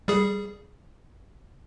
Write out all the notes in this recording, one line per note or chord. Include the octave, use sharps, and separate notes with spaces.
G3 G#4